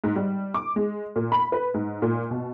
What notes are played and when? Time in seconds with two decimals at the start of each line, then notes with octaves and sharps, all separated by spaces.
0.04 G#2
0.16 G3
0.54 D6
0.76 G#3
1.16 A#2
1.32 B5
1.52 B4
1.74 G#2
2.02 A#2
2.31 B2